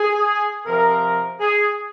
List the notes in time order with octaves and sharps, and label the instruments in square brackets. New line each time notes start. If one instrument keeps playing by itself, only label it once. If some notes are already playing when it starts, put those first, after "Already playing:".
Already playing: [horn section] G#4
C3 F3 C4 A#4
G#4